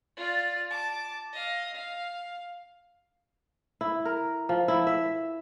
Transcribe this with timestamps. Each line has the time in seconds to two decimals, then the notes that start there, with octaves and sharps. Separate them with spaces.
0.17 F4 D5
0.71 A5 D6
1.33 D#5 F5
1.74 F5
3.81 E4
4.05 A#4
4.49 F3
4.68 E4
4.87 E5